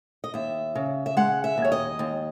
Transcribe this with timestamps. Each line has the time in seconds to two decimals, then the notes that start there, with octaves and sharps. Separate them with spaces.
0.24 D#5
0.34 D#2 E5
0.75 C#3
1.06 E5
1.17 G#3 F#5
1.44 E5
1.58 D#2
1.65 C#5
1.72 D#5
1.99 D#2